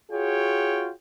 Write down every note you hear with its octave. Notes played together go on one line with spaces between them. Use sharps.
F4 F#4 G#4 C#5 G5